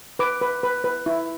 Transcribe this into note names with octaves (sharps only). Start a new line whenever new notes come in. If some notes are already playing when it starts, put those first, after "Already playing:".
B4 D6
B4
B4
B4
E4